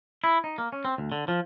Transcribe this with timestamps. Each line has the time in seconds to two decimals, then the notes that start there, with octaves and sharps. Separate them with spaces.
0.24 E4
0.44 D#4
0.58 A#3
0.72 C#4
0.85 C4
0.98 D2
1.12 D3
1.28 F3